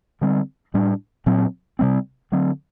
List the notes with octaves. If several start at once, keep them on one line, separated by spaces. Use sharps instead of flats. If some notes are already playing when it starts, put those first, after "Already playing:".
D3 G3 C4
A2 G3 D4
A#2 F#3 C4
C3 G3 C4
D3 F#3 C4